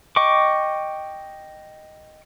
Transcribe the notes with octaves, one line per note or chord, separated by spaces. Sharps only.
D#5 G5 C#6 D6